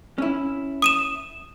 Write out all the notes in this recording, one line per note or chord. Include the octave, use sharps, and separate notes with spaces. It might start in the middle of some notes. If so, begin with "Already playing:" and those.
C#4 E4
D#6 D#7 E7